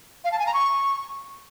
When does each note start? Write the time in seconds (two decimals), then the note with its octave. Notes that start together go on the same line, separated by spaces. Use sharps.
0.24 F5
0.31 A5
0.39 G#5
0.46 A#5
0.54 C#6